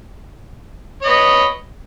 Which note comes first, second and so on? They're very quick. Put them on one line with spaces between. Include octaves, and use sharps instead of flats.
C#5 D#5 B4